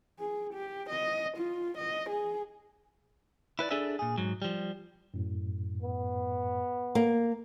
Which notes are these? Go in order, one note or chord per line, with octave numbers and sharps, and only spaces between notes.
G#4
G4
D#5
F4
D#5
G#4
E4 B4 C5 D5
D4 G#4 A4 D5 E5
A#2 G#4
G#2 F#3
F3 G3
F#2 A2
B3
A#3